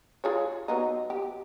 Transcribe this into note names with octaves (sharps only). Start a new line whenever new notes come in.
F4 G#4 C#5
F#3 B3 D#4
G4